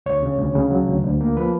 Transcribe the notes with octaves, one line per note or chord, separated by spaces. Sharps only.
D2 C#5
C#3
D2
C#3
F#3
D2
D2
A#3
F3 B4